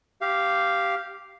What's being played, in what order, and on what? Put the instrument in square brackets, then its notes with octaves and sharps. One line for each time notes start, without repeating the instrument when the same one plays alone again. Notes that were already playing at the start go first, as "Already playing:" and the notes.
[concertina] G4 F5